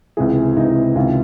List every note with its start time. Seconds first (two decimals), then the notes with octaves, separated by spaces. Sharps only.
0.17 C#2 C3 E3 G#4
0.56 C#2 C3 E3 D#4
0.95 C#2 C3 D#3 F4